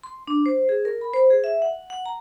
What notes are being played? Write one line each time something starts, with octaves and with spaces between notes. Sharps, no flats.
C6
D4
C5
G#4
A#4
B5
C5
G#4
E5
F#5
F#5
A#5